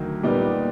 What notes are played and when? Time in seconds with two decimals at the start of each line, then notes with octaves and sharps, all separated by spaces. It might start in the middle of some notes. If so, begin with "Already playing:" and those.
Already playing: D2 D#3 F#3
0.23 A#2 G3 B3 D#4